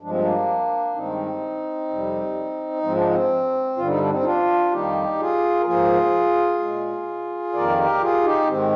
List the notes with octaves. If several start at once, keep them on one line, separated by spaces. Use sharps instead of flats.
G2 F3 G#3 D4
C4
A#3 D4
G2 D#3 G#3 C4 D#4
F2 C3 G3
G#2 F3 G#3 C4
D4
C4
G2 D3 G3 F4
D#4
D4
C4 D#4
D#4
D4 F4
F2 D#3 G3 A#3 D#4 G4
F4 G#4
A#4
G#2 F3 A#3 F4 G#4
A#2 G#3
F2 D#3 A#3 A#4 D5
G#4
G4 A#4
F4 G#4
D#4 G4
G#2 D#3 G#3 C4